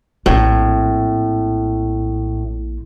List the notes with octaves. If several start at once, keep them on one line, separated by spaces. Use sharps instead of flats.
A#1 A2 C4